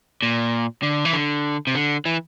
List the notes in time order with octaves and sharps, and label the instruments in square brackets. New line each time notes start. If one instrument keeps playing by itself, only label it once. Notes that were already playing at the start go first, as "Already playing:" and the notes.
[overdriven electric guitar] A#2
D3
E3
D3
C3
D3
E3